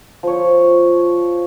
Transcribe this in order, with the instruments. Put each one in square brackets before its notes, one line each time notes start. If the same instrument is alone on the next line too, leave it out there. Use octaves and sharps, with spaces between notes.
[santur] F3 C#5